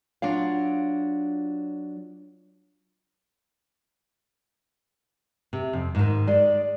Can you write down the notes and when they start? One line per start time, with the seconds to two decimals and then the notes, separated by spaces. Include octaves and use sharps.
0.22 F#3 D4 F4 F5
5.53 C3
5.73 F2
5.95 G#2 D#3
6.27 G#3 D5